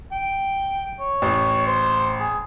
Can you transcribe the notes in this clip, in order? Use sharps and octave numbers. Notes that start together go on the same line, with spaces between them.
G5
C#5
A1
C5
G#4